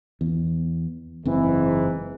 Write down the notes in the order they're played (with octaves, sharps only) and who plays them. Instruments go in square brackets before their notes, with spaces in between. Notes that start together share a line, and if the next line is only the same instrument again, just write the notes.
[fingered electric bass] E2
[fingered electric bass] F#1 C4 [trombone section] G#2 E3